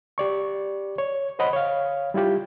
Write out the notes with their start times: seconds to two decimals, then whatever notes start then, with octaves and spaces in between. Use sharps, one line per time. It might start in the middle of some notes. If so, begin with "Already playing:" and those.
0.18 G4 D5 C#6
0.98 C#5
1.39 C5 C#5 D#5 F#5 B5
1.53 C#5 F5
2.14 G3 E4 F4 G4